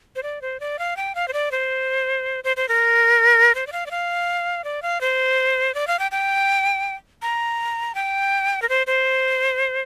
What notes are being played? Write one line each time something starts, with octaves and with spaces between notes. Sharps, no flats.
C5
D5
C5
D5
F5
G5
F5
C5
D5
C5
C5
C5
A#4
C5
D5
F5
D5
F5
D5
F5
C5
D5
F5
G5
G5
A#5
G5
A#4
C5
C5